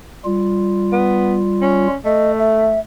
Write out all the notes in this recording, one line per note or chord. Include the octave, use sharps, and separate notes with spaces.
G3 F4
B3
C#4
A3 D#5
E5